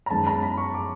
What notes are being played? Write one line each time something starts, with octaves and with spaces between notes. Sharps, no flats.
A#5
F#2 D#3 G#3 B3 A5
A#5
B5
C#6
D6